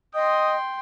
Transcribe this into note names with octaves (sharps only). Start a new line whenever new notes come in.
D#5 G5 C6 D#6